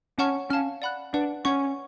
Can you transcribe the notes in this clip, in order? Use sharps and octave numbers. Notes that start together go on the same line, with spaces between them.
C#4 C#5 F#5 A5 C#6 F6
C#4 F5 A5 F6
D5 F#5 B5 F#6
D4 B4 D5 F#5
C#4 C#5 F#5 C#6